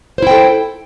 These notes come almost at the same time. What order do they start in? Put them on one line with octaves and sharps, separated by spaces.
C5 E4 G5 A4